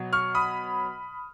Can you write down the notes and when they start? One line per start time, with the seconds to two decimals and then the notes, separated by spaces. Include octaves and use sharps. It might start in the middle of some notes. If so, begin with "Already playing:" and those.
Already playing: B2 F#3
0.13 C#6 F6
0.35 B5 D#6